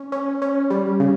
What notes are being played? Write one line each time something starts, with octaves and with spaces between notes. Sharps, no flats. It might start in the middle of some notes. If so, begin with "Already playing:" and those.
Already playing: C#4
C#4
C#4
G3
C#3